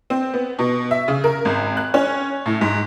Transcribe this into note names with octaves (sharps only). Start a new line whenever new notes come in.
C4
B3
B2
E5
C#3
A#4
G#1
F#6
C#4
A2
G#2